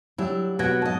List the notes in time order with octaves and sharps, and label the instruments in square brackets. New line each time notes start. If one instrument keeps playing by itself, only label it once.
[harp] F#3 D4 G4 [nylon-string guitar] E4
[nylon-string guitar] B2 [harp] F#5 G#6 A#6
[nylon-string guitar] G#2 D#5 [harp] A5